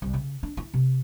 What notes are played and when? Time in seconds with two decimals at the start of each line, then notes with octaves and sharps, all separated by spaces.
0.02 C2
0.14 C#3
0.43 D4
0.57 E4
0.74 C3